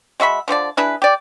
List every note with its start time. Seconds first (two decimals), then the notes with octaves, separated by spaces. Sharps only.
0.20 G#3 F#4 E5 B5
0.48 D3 F3 G4 D5
0.77 D4 E4 G#4 B4
1.02 G4 D5